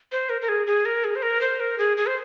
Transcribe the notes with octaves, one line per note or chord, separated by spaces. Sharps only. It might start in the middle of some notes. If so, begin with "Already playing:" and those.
C5
A#4
A#4
G#4
G#4
A#4
G#4
C5
A#4
C5
A#4
G#4
G#4
C5